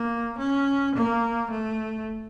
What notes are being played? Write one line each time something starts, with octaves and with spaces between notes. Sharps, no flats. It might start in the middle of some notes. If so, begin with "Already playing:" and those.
Already playing: A#3
C#4
A#3
A3